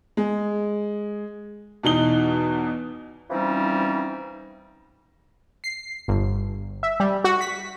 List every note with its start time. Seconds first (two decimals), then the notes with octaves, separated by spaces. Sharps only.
0.17 G#3
1.83 E2 B2 D#4 G7
3.29 E3 F3 G3 C4 C#4 D#4
5.64 C7
6.08 G1
6.83 E5
7.00 G3
7.24 F#4
7.41 B6